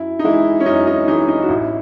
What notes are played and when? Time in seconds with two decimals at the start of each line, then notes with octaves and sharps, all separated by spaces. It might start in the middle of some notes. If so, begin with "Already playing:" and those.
Already playing: F#2 E4
0.19 D#4
0.24 E3 G#3 E4
0.60 C#4
0.66 F#2 D#4
0.87 D#4
1.08 E3 G#3 D#4
1.28 D#4
1.42 F#4
1.49 A1 E4